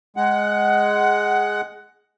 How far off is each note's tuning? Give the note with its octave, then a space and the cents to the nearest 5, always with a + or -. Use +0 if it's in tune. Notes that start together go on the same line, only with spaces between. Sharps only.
G#3 +0 F#5 +15